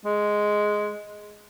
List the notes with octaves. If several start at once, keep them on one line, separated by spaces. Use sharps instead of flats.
G#3